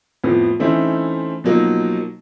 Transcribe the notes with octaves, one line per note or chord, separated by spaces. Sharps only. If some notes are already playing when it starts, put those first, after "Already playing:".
F2 A2 F3 B3
E3 A3 C4 C#4 D#4 E4
B2 F3 F#3 A#3 D#4